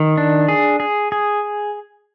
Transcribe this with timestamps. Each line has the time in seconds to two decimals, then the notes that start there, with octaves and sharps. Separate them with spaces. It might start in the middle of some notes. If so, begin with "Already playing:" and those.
Already playing: D#3
0.17 D4
0.48 G#4
0.80 G#4
1.12 G#4